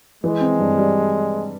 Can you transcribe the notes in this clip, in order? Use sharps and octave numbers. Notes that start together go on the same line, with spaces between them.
E3 G#3
C4
G2
G3